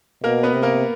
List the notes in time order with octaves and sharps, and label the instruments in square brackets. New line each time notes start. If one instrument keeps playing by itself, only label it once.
[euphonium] B2 [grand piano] A#3 A#4
[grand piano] B3 B4
[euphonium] C3
[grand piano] A#3 A#4